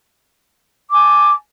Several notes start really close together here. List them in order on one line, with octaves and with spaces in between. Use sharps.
D6 G#5 A5